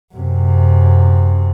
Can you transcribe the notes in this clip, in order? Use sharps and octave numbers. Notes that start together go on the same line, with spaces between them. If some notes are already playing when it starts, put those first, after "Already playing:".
F#2 C3